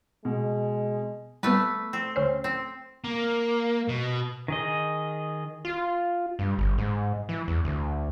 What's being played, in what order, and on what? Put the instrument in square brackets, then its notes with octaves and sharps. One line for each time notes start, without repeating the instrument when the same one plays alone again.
[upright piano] B2 [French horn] G#3
[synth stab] G3 B3 [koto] A3 B4
[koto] C4
[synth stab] D2 C#4 C5
[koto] C4
[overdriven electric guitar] A#3
B2
[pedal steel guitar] D#3 G#4 D#5
[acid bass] F4
G2
G1
G#2
E3
E2
D2